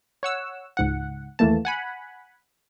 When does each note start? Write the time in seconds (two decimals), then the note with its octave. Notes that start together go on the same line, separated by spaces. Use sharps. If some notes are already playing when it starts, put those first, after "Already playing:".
0.23 C#5 F#5 E6
0.77 C#2 G#2 F#5
1.39 D#2 E3 A3 A#3 A5
1.65 F#5 G#5 B5